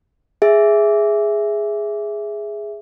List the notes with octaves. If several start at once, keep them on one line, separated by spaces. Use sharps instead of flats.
G#4 E5